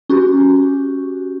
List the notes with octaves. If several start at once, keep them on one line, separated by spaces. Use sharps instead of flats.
C#4 F#4 G4